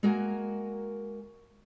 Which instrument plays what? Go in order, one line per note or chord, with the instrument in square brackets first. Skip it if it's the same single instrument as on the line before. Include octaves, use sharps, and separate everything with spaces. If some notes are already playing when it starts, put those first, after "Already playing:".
[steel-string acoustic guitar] G#3 A#3 F#4 A#4 G#5